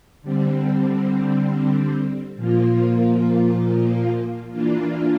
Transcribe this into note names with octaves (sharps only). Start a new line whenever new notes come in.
D3 G3 C4
A#2 F3 A#3 F4
E3 A#3 D4 F4